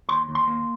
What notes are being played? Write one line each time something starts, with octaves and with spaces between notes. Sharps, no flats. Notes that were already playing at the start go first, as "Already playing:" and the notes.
D#2 C6
D#2
C6
A#3